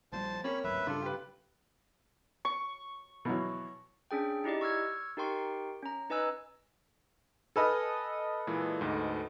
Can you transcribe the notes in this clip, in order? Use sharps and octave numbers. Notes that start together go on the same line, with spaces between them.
A#1 F3 G3 C5 A5
A#3 C4 C#4 C#5 B5
D1 G#1 F#2 B4 E5
G2 C#3 G3 D4 F4 A4
G4 B4
C#6
B2 E3 F#3
C#4 D4 G#4 G5
D#4 E4 G4 D5 D#5
C#6 E6 F6 G#6
D#4 G4 A#4 G5 C6 C#6
C#4 A#5
D#4 B4 D#5 G#5 E6 F#6
A4 B4 D#5 G#5 E6 F6
A#2 E3 G#3
D2 G#2